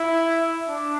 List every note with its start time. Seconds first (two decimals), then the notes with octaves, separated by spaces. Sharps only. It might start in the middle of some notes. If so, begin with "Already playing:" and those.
Already playing: E4
0.69 D4